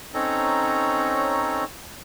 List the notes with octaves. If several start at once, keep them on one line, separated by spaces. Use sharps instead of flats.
C4 C#4 D#4 A4 C#5 A#5